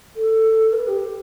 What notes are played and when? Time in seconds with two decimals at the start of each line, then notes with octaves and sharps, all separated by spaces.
0.16 A4
0.72 B4
0.86 G4